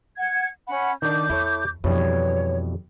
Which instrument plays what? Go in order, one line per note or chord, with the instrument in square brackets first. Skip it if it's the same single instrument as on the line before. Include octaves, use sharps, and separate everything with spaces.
[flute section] F#5 G#6
C#4 F#5 B5
[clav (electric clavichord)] D#3 D4 [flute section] D6 G6
[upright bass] E2 [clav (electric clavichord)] E4 A4 C#5
[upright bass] F2 [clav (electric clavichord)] B2 E3 G3 [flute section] C#5